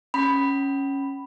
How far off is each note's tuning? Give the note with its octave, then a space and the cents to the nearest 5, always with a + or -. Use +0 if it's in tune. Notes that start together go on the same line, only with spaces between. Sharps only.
C#4 -5 B5 +0